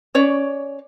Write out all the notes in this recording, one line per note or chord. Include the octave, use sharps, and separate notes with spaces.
C#4 C#5 D5